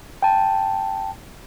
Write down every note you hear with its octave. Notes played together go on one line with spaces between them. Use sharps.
G5 A5